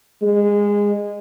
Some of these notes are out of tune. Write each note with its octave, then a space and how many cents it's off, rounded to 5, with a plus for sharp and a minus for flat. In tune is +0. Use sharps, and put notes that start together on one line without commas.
G#3 -20